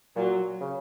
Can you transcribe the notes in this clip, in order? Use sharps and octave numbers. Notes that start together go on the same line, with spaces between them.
A#2 F#3
C#3